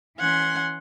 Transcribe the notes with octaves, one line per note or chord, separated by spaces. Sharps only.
E3 C#4 F#5 C6 G#6